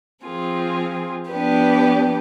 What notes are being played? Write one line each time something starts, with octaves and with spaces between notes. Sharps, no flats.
F3 C4 F4 G#4
F3 B3 D4 G4 B4